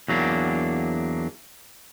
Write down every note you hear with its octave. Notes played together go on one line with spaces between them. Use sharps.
E2 F#3 A#3 D4